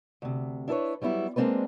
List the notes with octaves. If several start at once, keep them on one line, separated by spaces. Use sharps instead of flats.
D2 C3
D4 E4 A4 B4 C#5
F#3 G3 B3 E4
G#3 A#3 C4 D4 B4